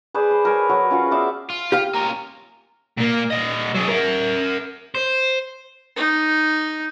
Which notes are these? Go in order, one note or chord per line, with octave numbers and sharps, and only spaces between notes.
G#4 B4 C5 D5
C6
A#4 B4 C#5 G#5
F#3
C#4 F4 F#4
B3 C5 D5 E5
F4
G4 F5
A#3 C#4 F4 A#5
A#2 A#3
A#2 D#5
F#3 G#4
A#4 E5
C5
D#4